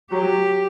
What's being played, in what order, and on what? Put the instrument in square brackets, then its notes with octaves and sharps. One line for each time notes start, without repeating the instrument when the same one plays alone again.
[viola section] F#3 [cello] G4